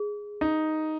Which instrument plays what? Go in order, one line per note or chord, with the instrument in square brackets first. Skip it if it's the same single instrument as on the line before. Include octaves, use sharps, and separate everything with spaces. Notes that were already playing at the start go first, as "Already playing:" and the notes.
Already playing: [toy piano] G#4
[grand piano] D#4